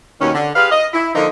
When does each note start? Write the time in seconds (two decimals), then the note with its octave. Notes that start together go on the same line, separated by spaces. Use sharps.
0.20 D#2 B2 D#3 C#4
0.34 D3
0.55 G4 G#4 B4 F5
0.71 D#5
0.93 E4
1.14 D3 F3 A#3 D#4